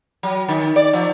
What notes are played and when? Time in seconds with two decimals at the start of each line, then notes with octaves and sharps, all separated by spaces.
0.23 F#3
0.49 D#3
0.76 D5
0.93 F3